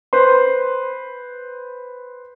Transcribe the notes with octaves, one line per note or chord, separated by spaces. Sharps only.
B4 C5 C6